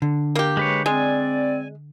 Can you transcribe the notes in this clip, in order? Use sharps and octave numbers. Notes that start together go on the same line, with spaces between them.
D3
A#3 G4
G#3 B4 C#5
G#3 C4 D5 G#5